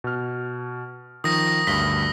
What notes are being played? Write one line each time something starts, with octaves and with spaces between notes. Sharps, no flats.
B2 F6
D#3 F3 D#6 A#6
D2 G2 B6 G7